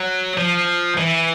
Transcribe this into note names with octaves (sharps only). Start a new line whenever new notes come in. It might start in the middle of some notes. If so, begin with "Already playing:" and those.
Already playing: F#3
F3
E3